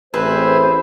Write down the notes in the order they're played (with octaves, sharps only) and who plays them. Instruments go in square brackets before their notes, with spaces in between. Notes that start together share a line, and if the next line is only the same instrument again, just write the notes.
[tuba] A1 [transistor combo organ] C4 G#4 E5 [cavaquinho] B4 [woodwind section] C5